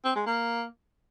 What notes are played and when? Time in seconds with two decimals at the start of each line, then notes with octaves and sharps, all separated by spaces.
0.05 C4
0.16 G#3
0.26 A#3